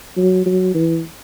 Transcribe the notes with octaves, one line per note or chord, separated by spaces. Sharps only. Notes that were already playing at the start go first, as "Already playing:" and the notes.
F#3
F#3
E3